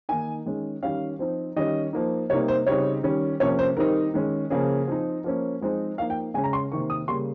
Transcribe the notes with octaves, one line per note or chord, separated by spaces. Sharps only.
D#3 A#3 D#4 G#5
D#3 G#3 C#4
D#3 G3 C#4 F5
F3 C4 D#4
D#3 G3 C#4 D#5
F3 A#3 D#4
C3 G3 A#3 D#4 C#5
C5
C#3 G3 C4 D#4 C#5
D#3 G3 C#4
C3 F3 A#3 C#4 C#5
C5
D#3 G3 C4 D#4 A#4
D#3 G#3 C#4
C#3 F3 A#3 C#4 G#4
F3 C4 D#4
F3 A#3 C#4
F3 G#3 C4 D#4
F3 A#3 D#4 F5
G5
C#3 G#3 C#4 G#5
A#5
C6
C3 D#3 A#3 C#6
D#6
C#3 G3 A#3 C6